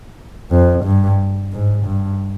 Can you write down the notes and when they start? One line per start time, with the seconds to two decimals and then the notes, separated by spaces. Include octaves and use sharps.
0.51 F2
0.84 G2
1.52 G#2
1.86 G2